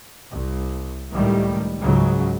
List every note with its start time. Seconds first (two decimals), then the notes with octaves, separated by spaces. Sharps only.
0.32 C2
1.11 C#2 A2 D#3 G3 A3
1.82 C#2 G#2 C#3 F#3